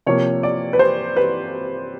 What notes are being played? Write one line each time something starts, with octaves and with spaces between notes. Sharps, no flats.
C3 F3 A#3 C#5
D5
B4
C5
B4